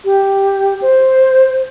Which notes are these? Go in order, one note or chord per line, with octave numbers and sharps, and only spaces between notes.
G4
C5